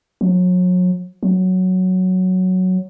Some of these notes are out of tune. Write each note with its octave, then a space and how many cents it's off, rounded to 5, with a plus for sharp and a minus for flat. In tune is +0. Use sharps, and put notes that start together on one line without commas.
F#3 -35
F#3 +0